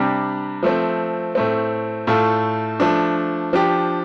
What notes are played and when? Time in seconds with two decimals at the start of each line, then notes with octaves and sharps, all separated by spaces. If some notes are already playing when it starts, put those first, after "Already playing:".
Already playing: C3 G3 D4 G4
0.63 F3 A3 C4
1.35 A2 A3 C4
2.07 A2 A3 F4 A4
2.80 F3 A3 D4
3.53 F3 D4 G4